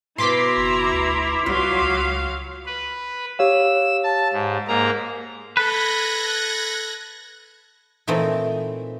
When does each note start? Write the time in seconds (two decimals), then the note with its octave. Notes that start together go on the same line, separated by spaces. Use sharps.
0.18 B2 B3 E4 A#5 C6 D6 B6
0.57 F#1
0.93 D2
1.46 C2 F#3 F4 F5
1.82 C#2
2.66 B4
3.39 G4 C#5 F5 E6
4.03 A5
4.33 G#2
4.68 G#2 A#3 A#5
5.57 A4 B4 F#6 G#6 A#6
8.07 A#2 E3 A3 C4 D#4